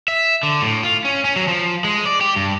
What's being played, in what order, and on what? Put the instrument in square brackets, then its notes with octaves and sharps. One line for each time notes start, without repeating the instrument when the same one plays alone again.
[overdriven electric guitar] E5
D3
A2
F4
C#4
C#4
F#3
F3
G#3
D5
G4
G2